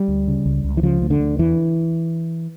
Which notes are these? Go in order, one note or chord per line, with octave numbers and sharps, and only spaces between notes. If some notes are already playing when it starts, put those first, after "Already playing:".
Already playing: G3
D2
C#3
C#2
C#2
E3
C#3 F3
D2
D3
D2
E2 E3